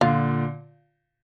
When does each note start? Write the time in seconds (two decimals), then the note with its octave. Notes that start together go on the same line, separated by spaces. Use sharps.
0.01 A#2 D3 F4